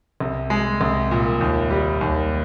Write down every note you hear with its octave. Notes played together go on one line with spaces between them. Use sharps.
C2
G#3
C2
A#2
D#2
G3
D#2